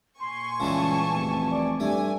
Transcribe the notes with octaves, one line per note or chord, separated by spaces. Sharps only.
A#2 G#5 C6 C#6
C#2 C#3 E3 G3 A5
F1 A5
D5
G2 A3 G#5